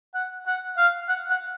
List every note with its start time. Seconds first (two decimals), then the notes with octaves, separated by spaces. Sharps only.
0.14 F#5
0.46 F#5
0.77 F5
1.09 F#5
1.30 F#5